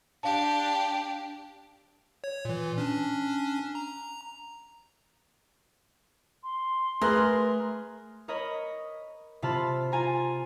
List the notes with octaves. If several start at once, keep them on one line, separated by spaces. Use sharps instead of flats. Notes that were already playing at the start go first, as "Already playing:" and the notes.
D4 G4 F5 A5
C#5
A#2 E3
C#4 D4
A#5
C6
A3 G#4 A#4 B4 F#6
A#4 C#5 D#5 B5
C3 F4 A5 B5 F6
F4 G#5 A#5